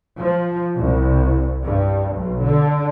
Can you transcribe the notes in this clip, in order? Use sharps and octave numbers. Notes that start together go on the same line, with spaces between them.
F3
C2
G2
B1
D3